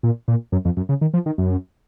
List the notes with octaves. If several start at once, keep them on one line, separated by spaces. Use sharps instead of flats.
A#2
A#2
F#2
F2
F#2
C#3
D#3
F3
D#3
F#2